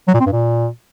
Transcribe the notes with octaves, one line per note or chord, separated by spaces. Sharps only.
F#3
A#2
C4
G2
A#2